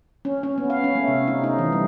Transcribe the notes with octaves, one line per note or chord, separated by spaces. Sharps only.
C#4
C#4
B3
F5
C#4
A3
C3
D#4
D#4
E3
G3